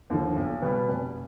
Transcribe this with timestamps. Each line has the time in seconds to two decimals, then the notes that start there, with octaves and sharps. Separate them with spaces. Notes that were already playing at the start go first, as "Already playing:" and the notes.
0.10 D#2 D3 F3
0.36 B1
0.62 B2 G3 B3
0.88 F1